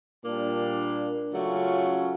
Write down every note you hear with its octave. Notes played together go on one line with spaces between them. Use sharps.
A#2 G3 A#3 D4
C#3 F#3 A3 C#4 F4